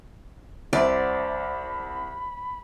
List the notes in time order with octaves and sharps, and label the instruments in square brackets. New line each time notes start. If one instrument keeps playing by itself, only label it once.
[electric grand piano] C2 [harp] C5 E5 F#5 [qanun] D5 [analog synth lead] B5